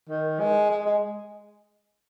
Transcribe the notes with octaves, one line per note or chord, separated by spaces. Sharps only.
D#3
G#3
G#3
G#3